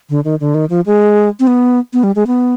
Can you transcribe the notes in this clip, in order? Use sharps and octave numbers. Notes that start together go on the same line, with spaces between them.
D3
D#3
D3
D#3
F3
G#3
C4
B3
B3
G3
G#3
B3